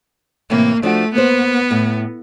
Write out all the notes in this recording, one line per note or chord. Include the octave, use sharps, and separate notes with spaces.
A2 C3 E3 A#3
F3 A3 D4 F#4
A#3 B3 B4 C5
A2